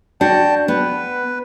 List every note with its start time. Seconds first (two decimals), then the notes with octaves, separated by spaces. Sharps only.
0.21 D4 F#4 G5 A5
0.68 B3 B4